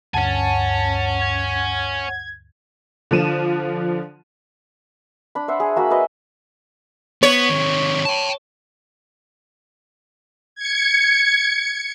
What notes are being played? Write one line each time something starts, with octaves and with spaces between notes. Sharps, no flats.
D2 G2 C#5 F#5 G#5 A5
G#6
D3 F3 D#7 E7
D4 B5
C5 E5 F#5
G#4
A#3 F#4 E5 B5
F#4 B4 D#5
B3 C#5
C3 D#3
G5 A5
G#6 C#7